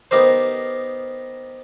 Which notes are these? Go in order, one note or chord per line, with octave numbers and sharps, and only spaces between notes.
B3 D#4 G4 A#4 C5